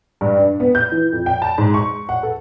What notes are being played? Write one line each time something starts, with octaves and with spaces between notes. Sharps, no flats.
G2
D4
B3
G6
E3
F2
G5
A5
G#2
C#6
F#5
A4